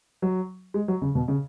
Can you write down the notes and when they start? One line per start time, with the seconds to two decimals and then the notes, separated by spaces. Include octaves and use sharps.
0.22 F#3
0.74 G#3
0.88 F#3
1.02 C#3
1.15 B2
1.28 C#3